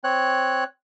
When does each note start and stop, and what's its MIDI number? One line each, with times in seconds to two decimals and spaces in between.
0.04 0.64 60
0.04 0.64 73
0.04 0.64 90